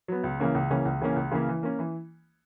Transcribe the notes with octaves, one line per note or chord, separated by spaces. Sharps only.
F#3 B3
C#2
C#3 E3 A#3 C#4
C#2
C#3 E3 A#3 C#4
C#2
C#3 E3 A#3 C#4
C#2
C#3 E3 A#3 C#4
E3
A#3 C#4
E3